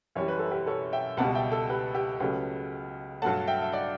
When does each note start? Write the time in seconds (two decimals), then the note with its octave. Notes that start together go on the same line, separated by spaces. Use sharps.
0.15 F#2 E3 G3 C#5
0.28 B4
0.39 A4
0.51 G4 B4
0.67 A4 C#5
0.93 E5 G5
1.17 C#2 B2 G3 F#5 A5
1.35 E5 G5
1.52 A4
1.69 G4 B4
1.95 G4
2.20 C#2 C#3 F#3 A3 G4 B4
3.22 G2 F#3 A3 F#5 A5
3.47 E5 G5
3.62 E5
3.72 D5 F#5